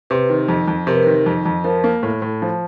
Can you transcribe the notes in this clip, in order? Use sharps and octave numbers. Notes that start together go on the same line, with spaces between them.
C3 B4
D#3
F2
F2
C3 A#4
B4
D#3 A#4
F2
F2
F3 A#4
A#3
A2
A2
F3